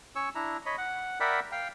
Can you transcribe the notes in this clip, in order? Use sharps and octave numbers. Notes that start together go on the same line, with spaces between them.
C#4 C#5 C#6 E6
D4 E4 A#5
C#5 D#5 B5
F#5
A#4 D5 E5 F#5 G5 B5
F5 G5